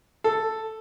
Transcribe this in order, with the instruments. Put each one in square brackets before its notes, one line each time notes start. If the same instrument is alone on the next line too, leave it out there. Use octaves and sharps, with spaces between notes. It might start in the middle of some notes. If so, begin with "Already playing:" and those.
[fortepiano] A4